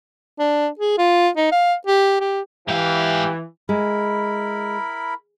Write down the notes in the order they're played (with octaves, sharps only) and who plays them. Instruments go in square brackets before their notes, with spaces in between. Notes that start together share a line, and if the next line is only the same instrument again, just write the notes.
[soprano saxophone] D4
G#4
F4
D#4
F5
G4
G4
[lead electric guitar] G#2 F5 [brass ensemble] E3 [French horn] G4
[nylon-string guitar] G#3 [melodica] E4 A#4 B5